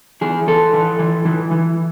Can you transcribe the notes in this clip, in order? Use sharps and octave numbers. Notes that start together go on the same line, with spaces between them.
E3 G#4
E3 A4
E3
E3
E3
E3